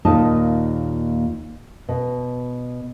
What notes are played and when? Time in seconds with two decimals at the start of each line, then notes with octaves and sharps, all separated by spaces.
0.05 D#2 A#2 D#4 D#5 A5
1.89 B2